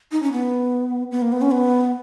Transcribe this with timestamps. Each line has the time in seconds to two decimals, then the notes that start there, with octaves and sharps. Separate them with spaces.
0.12 D#4
0.23 C#4
0.32 B3
1.11 B3
1.22 A#3
1.32 B3
1.42 C#4
1.51 B3